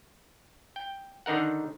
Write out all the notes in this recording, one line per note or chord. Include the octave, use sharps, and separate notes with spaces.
G5
D3 D#3 D#4 A#4 F#5